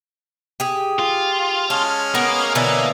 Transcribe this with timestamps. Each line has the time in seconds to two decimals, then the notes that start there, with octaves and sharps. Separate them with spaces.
0.60 G4 G#4
0.99 F4
1.70 G#3 C#4 A5 F6
2.15 A#3 B3
2.55 B2 D3 E3 C#5 E5 G#5